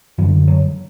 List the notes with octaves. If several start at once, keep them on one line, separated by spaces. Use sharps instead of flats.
F#2 D3 F3
F#3